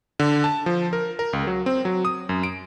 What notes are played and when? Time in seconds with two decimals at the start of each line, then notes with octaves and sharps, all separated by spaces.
0.19 D3
0.44 A5
0.66 F3
0.93 A#4
1.19 A#4
1.33 C#2
1.47 F#3
1.66 C4
1.85 F#3
2.05 D#6
2.29 F#2
2.43 D7